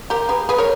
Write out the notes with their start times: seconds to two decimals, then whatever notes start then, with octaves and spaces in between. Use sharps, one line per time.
0.10 G4 A#4
0.29 G#4 B4
0.49 G#4 B4
0.58 A#4 C#5